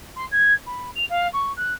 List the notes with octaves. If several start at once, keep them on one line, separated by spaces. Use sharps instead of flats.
C6
G#6
B5
F7
F5
C#6
F#6